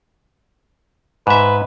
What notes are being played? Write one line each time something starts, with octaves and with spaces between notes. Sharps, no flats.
G#2 B4 E5